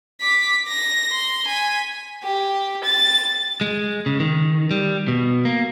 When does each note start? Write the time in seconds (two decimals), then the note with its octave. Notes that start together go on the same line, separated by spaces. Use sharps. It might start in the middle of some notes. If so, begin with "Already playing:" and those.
0.21 D6 B6
0.68 A#6
1.11 C6
1.47 G#5 B6
2.23 G4
2.84 A6
3.61 G#3
4.06 C#3
4.20 D#3
4.71 G3
5.08 B2
5.45 A#3